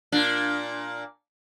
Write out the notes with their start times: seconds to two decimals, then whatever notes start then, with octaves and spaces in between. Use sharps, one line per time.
0.12 A#2 D4